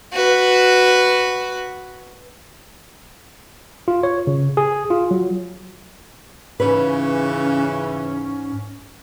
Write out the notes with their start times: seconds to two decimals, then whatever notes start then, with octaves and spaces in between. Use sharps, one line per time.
0.12 F#4 B4
3.88 F4
4.03 C#5
4.27 C#3
4.57 G#4
4.90 F4
5.11 F#3
6.60 G#2 C#3 E3 C#4 B4